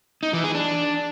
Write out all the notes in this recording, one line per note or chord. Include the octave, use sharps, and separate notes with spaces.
D#4
E3
G#4
D4